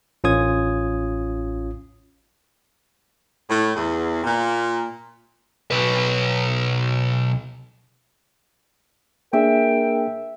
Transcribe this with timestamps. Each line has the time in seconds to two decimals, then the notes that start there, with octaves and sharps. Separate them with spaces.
0.24 A1 C#4 F4 D#6 G#6
3.50 A2
3.75 E2
4.24 A#2
5.71 B1 B4
9.33 A#3 D4 G#4 A#4 E5 G5